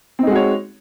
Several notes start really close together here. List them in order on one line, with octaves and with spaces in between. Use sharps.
C4 D#4 G#3 F#4 C#5